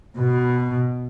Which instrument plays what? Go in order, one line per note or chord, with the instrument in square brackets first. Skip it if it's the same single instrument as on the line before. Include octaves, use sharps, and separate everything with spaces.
[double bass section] B2